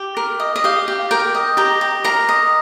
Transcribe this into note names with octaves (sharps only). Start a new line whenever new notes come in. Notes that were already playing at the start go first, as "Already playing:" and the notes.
Already playing: G4
A#4
D#5
D#5
G4 F5
G4
A#4 G5
D#5
G4 A#5
G4
A#4 A#5
D#5